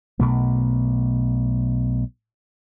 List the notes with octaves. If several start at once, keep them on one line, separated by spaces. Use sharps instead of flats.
B1 B2 A3